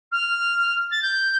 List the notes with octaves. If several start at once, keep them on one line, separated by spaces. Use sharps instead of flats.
F6
A6
G6